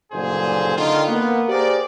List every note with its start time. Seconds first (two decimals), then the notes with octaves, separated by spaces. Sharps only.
0.12 F#1 G2 A#2 D3 G#4 C5
0.77 D3 D#3 F4
1.07 A#3 B3
1.49 G4 G#4 A#4 C5 D5